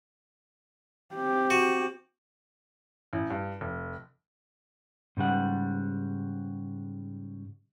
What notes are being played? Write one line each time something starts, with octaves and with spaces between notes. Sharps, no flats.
C4 G4
F#4
A1
G2
F1
G#2 C#3 G3 F#5